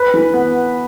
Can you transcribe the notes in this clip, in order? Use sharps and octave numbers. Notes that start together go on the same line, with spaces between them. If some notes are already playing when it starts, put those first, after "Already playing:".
Already playing: B4
E3
B3